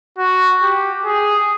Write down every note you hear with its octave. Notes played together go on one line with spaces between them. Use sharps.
F#4
G4
G#4